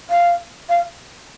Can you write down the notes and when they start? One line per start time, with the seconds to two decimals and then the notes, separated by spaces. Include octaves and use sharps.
0.10 F5
0.69 F5